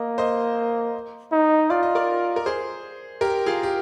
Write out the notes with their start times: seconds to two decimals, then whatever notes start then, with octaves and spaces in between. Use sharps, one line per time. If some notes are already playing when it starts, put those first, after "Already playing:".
Already playing: A#3 D#5
0.18 C5 D#5
1.32 D#4
1.70 F4 D5
1.83 D#5
1.95 A#4 D5
2.36 A#4
2.46 G#4 C5
3.21 G4 A#4
3.46 F4 G#4
3.63 G4